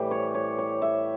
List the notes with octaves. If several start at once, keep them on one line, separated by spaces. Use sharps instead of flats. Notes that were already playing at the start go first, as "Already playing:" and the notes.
Already playing: A2 E3 G3 G4
C#5
C#5
C#5
E5